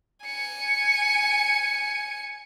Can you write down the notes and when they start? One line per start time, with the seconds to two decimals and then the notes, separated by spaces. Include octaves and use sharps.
0.24 G#5 C#7